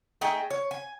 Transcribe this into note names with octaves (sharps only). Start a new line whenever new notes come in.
A3 D#4 G#4 G5
C#5
G#5